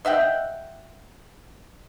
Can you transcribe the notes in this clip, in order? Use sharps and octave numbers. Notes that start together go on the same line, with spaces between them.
D#5 E5 F#5 G5